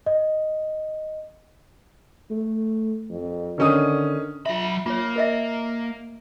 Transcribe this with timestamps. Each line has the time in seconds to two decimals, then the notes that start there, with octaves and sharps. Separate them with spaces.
0.06 D#5
2.31 A3
3.10 F2
3.58 D3 D#3 C#4 D#6
4.46 F#3 F4 E5 B5
4.86 A#3 F4 C#5
5.16 A#4 D#5 E5